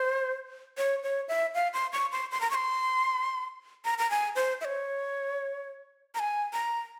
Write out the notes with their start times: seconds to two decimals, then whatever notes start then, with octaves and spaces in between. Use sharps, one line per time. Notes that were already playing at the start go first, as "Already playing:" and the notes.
Already playing: C5
0.78 C#5
1.03 C#5
1.28 E5
1.55 F5
1.73 C6
1.93 C#6
2.12 C6
2.31 C6
2.41 A#5
2.50 C#6
2.55 C6
3.85 A#5
3.98 A#5
4.11 G#5
4.36 C5
4.61 E5
4.65 C#5
6.15 A#5
6.19 G#5
6.53 A#5